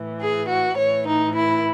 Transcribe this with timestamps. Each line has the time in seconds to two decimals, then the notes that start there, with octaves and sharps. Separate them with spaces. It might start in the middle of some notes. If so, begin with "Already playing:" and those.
Already playing: A2 E3
0.19 G#4
0.48 F#4
0.77 A2 E3 C#5
1.05 D#4
1.35 E4